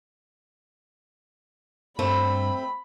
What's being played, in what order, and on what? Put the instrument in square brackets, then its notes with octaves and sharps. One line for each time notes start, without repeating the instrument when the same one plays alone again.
[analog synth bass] G2 [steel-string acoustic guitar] A3 C4 [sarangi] B5